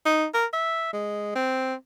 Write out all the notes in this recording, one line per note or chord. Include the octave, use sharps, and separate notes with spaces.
D#4
A#4
E5
G#3
C4